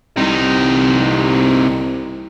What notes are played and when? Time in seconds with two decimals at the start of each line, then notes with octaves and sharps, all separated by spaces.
0.17 C2 C3 D#4